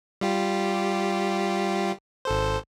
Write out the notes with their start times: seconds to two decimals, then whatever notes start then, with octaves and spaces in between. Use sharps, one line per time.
0.21 G3 F4 G4
2.25 G#1 A4 C5